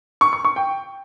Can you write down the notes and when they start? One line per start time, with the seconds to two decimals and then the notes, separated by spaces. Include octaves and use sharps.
0.21 C#6
0.33 C#6
0.45 C#6
0.56 G5